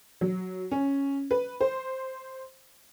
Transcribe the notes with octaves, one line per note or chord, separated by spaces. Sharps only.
F#3
C#4
B4
C5